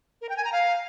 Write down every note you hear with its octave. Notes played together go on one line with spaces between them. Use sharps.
A#4
G5
G#5
A#5
F5